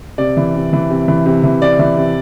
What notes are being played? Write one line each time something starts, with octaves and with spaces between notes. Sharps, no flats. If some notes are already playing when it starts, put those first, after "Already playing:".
C3 D5
E3
C3
E3
C3
E3
C3
E3
C3 D5
E3
C3